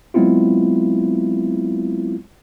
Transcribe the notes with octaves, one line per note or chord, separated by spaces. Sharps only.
F#3 G#3 B3 C4 E4 F4